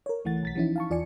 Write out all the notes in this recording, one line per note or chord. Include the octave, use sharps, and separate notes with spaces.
A#4 C#5
C#2 E3 A3 F#5 A6
B1 A6 B6
E3 F3 C#4 D#4 E4
F5 A5 C#6
E2 F4 D5 G#5 C#7